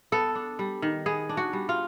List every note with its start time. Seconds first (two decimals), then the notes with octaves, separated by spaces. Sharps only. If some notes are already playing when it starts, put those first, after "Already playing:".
0.12 B3 A4
0.35 D4
0.59 G3
0.82 D#3
1.06 B3 G#4
1.29 D4
1.37 F#4
1.53 G3
1.69 F4